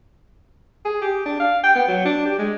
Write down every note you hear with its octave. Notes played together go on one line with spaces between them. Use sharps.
G#4
G4
D4
F5
G5
B3
F#3
D4
G4
G#3